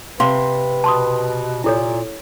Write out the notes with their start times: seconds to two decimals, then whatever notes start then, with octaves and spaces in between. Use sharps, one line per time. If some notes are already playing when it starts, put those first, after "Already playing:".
0.20 C3 B4 F5 F#5 C6
0.84 B2 A5 C6 D#6
1.64 A#2 E4 A4 C#5